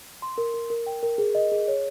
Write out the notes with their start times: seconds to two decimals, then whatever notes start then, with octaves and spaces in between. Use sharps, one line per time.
0.22 C6
0.38 A#4
0.54 A#4
0.70 A#4
0.86 G5
1.03 A#4
1.18 G#4
1.35 D#5
1.52 G#4
1.68 C#5